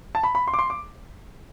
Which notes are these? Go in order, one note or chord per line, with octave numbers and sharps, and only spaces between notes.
A5
B5
B5
C6
D6
C6
D6